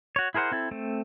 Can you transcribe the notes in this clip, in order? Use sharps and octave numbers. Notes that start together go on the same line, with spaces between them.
F#4 C#5
E4 G#4 A#4 C5 F#5
C4 E4 A4
A3 C4